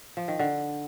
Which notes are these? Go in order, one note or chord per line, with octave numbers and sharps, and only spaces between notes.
F3
D#3
D3